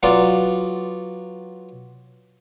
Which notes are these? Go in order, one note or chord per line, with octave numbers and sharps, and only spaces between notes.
F#3 B3 F4 D5